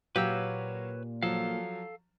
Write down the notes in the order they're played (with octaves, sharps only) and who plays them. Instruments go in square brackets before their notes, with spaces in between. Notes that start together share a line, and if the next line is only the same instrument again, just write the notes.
[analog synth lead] A#2 [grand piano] F#3 F#4 F5 [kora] G4 [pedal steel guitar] B4 C#5 E6
[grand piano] F3 F#3 [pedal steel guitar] A4 F5